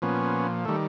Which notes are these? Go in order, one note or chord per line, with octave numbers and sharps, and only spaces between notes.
A#2 F3 B3 C#4
D#3 G3 A3